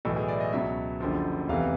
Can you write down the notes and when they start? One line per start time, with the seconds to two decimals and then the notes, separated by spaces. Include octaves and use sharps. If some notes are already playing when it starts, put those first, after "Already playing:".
0.05 B1 A2 E3 A4
0.16 G#4
0.28 D5
0.40 D#5
0.53 C#2 B2 F#3 E5
1.00 F#1 F#2 D3 F3
1.48 F1 E2 C3 E3 F5